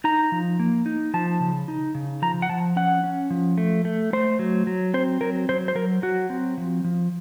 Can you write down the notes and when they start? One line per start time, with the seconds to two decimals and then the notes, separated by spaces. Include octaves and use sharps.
0.04 D#4 A#5
0.32 F3
0.60 A#3
0.86 D#4
1.14 F3 A5
1.40 C#3
1.68 D#4
1.95 C#3
2.22 F3 A#5
2.42 F#5
2.49 F3 A5
2.76 C#4 F#5
3.04 C#4
3.30 F3
3.58 A3
3.85 A3
4.13 A3 C5
4.39 F#3
4.67 F#3
4.94 C4 C5
5.21 F#3 A#4
5.49 F#3 C5
5.68 C5
5.75 F#3 A#4
6.02 F#3 F#4
6.30 C4
6.58 F3
6.84 F3